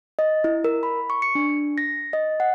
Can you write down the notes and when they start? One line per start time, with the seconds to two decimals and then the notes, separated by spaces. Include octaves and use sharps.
0.19 D#5
0.44 E4
0.64 A#4
0.83 B5
1.10 C#6
1.22 C#7
1.35 D4
1.78 A#6
2.13 D#5
2.40 F#5